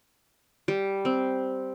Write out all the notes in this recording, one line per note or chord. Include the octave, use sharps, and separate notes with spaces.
G3
C4